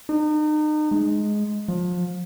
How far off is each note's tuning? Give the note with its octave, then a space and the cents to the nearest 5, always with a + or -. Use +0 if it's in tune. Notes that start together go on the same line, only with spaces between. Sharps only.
D#4 -35
G#3 +10
F3 +30